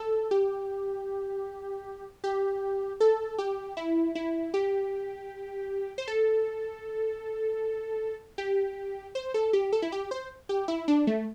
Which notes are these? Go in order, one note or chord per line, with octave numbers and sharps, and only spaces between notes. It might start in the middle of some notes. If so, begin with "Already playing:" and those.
Already playing: A4
G4
G4
A4
G4
E4
E4
G4
C5
A4
G4
C5
A4
G4
A4
E4
G4
C5
G4
E4
D4
A3